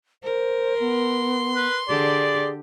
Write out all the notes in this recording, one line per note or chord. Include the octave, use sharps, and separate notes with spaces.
A#4 C5
B3 C6
B4
D3 G4 G#4 D5